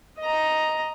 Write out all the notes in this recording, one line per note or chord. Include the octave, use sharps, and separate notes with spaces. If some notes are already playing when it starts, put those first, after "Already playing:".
D#5 A#5